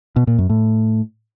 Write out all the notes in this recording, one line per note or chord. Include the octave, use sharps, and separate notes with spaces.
B2
A#2
F#2
A2